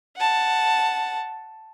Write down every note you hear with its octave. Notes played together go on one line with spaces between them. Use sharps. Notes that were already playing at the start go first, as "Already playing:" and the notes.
F#5 A5